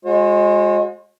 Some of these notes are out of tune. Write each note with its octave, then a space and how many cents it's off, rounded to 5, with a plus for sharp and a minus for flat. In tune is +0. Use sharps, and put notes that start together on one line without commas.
G#3 +0 F#4 -40 C5 +45